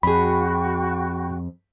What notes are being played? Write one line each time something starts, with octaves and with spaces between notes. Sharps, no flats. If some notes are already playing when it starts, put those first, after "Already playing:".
F2 F#4 G#4 G5 B5 C#6